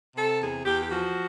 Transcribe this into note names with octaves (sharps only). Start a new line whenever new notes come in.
C3 A4
E2 G#4
E2 G4
G4
F3 F#4